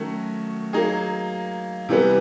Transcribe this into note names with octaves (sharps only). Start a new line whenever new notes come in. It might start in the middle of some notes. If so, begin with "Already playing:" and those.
Already playing: D#3 F#3 A3 C#4 F#4
F#3 A#3 D#4 G#4
C3 E3 G3 B3